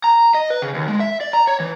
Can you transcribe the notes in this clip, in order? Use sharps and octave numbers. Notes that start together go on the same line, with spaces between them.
A#5
D#5
B4
C#3
D#2
G#3
E5
D5
A#5
C#5
E3